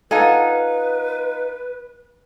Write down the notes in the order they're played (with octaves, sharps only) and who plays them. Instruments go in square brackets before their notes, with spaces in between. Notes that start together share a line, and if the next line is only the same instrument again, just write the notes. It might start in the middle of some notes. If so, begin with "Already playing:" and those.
[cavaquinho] D#4 F4 F#5 [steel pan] A4 G#5 [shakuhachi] B4